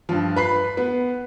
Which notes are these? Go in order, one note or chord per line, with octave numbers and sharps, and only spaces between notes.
G2 F3
B4 B5 C7
B3